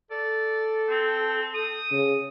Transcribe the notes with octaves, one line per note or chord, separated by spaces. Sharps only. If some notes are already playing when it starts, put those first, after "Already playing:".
A4 D5
C4
D#6
C#3